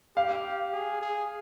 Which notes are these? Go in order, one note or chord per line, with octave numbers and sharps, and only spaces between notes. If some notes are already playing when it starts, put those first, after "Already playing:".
G4 F5
G#4
G#4